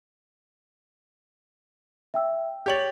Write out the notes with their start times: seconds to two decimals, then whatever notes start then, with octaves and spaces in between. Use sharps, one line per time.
2.14 E5 G5 E6
2.66 G4 C#5 G6 A6 F#7